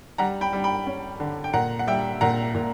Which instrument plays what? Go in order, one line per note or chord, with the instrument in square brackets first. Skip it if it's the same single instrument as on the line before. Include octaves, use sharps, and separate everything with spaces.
[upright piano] G3 F#5 A#5
G5 B5
G3
G5 B5
C#4
D3
G5
A#2 F#5 A#5
F#5
G3 E5 G5
A#2 F#5 A#5
A#2